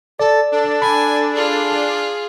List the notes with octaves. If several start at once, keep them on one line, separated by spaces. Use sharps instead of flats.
A4 D5
D4 A4
G#5 B5
F4 G#4